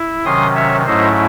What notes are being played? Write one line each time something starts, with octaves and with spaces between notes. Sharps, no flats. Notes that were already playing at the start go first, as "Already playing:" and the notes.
Already playing: E4
C3 D#3 F#3 C#4 C6 D#6
C#5 E5
G#2 F#3 A3 C#4 E4 C5 D#5